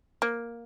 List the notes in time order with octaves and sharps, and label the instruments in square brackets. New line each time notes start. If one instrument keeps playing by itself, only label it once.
[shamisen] A#3